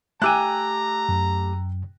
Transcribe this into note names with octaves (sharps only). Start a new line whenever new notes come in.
A3 G4 G5 G#5 A#5 E6 F#6
F#2